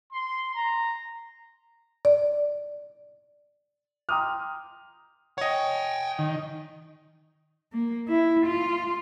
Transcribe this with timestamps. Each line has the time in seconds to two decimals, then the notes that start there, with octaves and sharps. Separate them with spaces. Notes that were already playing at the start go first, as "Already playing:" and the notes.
0.13 C6
0.55 A#5
2.05 D5
4.09 G5 A#5 C6 D6 D#6 F6
5.38 C#5 D#5 F#5 G5
6.19 D#3
7.73 A#3
8.08 E4
8.46 F4